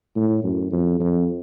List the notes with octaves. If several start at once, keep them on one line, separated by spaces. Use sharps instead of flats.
A2
F#2
F2
F2